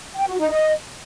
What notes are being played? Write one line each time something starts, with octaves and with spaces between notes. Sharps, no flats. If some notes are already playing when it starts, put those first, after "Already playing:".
G5
F#4
D#4
D#5